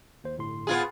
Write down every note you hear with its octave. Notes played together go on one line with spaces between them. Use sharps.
D#2 C5
G1 A2 C6
B3 F4 G#4